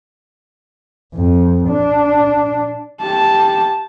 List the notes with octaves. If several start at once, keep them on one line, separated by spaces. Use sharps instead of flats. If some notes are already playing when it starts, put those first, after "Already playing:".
F2
D4
G4 A5